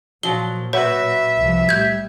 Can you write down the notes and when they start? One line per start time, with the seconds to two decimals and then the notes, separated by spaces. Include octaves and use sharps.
0.23 A#2 F3 F#3 G7
0.73 F#3 F#4 B4 C#5 E5
1.38 C2 F3
1.69 A2 G3 G6 G#6